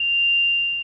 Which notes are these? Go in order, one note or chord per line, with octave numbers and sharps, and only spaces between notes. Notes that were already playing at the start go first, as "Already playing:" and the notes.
Already playing: F7